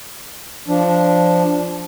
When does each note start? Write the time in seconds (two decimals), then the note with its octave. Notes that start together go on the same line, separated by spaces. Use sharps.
0.68 F3 D4